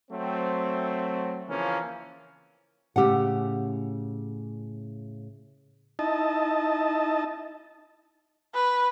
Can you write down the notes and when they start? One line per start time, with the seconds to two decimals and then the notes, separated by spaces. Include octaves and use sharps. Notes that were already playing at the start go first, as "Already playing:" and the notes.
0.11 F#3 A3 C4
1.48 C#3 E3 F3 A#3 C#4
2.96 A2 C#3 G4 F#5
5.99 D#4 E4 D#5 A5
8.55 B4